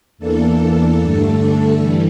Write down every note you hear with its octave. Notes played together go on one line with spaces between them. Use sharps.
E2 E3 A#3 D4 A4
G2 D3 A3 D4
G2 E3 G3